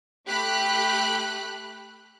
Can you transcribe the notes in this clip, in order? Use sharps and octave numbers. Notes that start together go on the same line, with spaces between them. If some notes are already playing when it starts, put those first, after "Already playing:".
A3 G4 B5 F#6